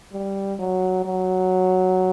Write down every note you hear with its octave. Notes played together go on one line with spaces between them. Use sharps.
G3
F#3
F#3